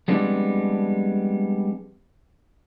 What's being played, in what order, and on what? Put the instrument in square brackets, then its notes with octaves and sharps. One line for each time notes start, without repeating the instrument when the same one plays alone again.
[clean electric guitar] F3 G3 G#3 B3 C4 D4